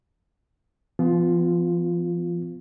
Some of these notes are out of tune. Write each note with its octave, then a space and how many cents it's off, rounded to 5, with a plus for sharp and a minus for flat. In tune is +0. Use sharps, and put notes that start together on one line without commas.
F3 -40 B3 +30 F4 +0